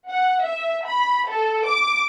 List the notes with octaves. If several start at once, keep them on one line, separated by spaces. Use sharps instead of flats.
F#5
E5
B5
A4
D6